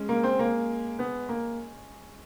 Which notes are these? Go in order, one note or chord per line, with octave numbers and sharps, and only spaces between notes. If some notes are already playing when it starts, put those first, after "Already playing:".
Already playing: G#3 C#4
A#3
C4
A#3
B3
A#3